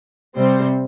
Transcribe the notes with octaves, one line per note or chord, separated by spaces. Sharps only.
C3 G3 C4 C5